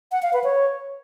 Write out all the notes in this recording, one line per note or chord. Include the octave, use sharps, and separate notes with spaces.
F#5
F5
B4
C#5